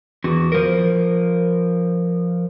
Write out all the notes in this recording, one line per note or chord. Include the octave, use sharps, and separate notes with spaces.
E2 F#4
F3 A#4